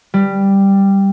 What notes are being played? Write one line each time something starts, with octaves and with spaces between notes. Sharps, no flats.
G3